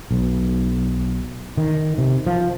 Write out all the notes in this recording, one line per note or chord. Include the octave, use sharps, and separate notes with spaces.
B1
D#3
C3
F3